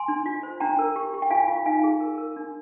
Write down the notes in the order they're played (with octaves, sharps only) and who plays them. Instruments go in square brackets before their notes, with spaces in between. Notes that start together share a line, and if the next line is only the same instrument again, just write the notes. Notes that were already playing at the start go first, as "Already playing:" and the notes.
Already playing: [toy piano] G#5 C6
D4
F4
C5
D4 G5 A#5
A#4
G4
G4
G5
F4 F5 G#5
F4
D#4 F5 G#5
G#4
A#4
A#4
D4